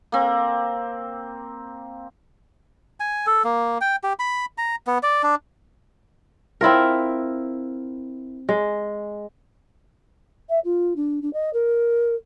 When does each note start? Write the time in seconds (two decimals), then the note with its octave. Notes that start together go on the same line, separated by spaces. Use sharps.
0.12 A#3 C4
3.00 G#5
3.27 A4
3.44 A#3
3.81 G5
4.03 G4
4.19 B5
4.58 A#5
4.87 B3
5.03 D5
5.23 D4
6.61 C4 E4 F4 A#4
8.49 G#3
10.49 E5
10.65 F4
10.96 D4
11.22 D4
11.34 D#5
11.54 A#4